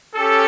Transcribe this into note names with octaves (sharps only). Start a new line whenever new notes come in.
C#4 G4 A4